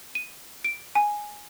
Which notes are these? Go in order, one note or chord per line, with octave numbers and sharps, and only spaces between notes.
D#7
D7
G#5